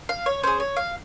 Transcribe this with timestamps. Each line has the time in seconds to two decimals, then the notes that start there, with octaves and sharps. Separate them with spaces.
0.09 F5
0.26 C#5
0.43 C#4 G#4 C5
0.60 C#5
0.77 F5